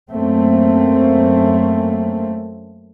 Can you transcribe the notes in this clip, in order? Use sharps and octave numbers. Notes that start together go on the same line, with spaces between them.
F#2 A3 A#3 C4